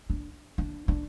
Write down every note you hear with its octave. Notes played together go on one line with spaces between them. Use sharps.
D4
D4
D4